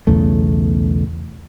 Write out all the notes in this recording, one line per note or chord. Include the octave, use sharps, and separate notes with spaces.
B1 E2 C#3 A3